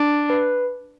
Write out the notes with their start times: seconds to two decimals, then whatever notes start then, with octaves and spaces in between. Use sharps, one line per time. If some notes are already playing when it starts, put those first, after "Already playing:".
Already playing: D4
0.30 B4